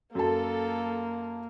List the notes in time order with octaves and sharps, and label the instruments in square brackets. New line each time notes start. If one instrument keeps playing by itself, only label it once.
[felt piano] F#2 A5 [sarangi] A#3 [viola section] A4